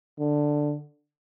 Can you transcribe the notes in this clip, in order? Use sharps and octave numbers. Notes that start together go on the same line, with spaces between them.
D3